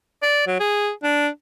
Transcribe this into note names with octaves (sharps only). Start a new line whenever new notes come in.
D5
F#3
G#4
D4